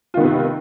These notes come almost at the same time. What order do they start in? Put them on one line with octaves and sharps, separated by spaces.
F4 D#3 B3 C3